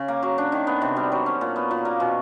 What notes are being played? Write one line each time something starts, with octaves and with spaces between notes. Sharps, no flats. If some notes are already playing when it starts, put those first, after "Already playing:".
Already playing: C#3
A#3
F#3
D4
D#3
B3
C3
G3
F#3
C#4
A#2
B3
A#2
A#3
B2